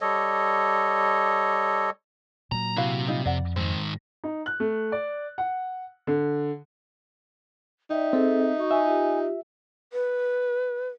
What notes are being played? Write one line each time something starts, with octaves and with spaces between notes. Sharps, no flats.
G3 A4 C#5 D#5
A#2 F#3 A#5
C3 E4 F#4 F5
G3 D#4 F4
F2 D5 F#5
G#2 D#3 C4
D#4
F#6
A3
D5
F#5
D3
D#4 D5 E5 G5
C4 G#4 A4
F#4 C#6
E5 G#5
F4 G4
B4